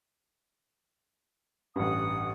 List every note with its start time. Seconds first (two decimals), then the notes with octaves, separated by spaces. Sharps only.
1.76 A1 G2 F#5 D#6